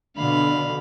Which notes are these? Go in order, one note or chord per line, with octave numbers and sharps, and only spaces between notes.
B2 D3 F5 B5